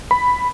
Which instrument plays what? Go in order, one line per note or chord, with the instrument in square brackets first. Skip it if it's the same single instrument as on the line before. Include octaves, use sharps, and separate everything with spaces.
[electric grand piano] B5